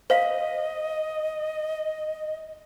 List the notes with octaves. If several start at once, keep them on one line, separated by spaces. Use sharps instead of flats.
C5 D#5 F5 B6